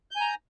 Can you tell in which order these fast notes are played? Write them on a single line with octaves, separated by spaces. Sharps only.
G6 G#5 A#5